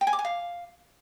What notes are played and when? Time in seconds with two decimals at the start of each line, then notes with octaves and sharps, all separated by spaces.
0.01 G5
0.07 G#5
0.13 D6
0.19 G#5
0.25 F5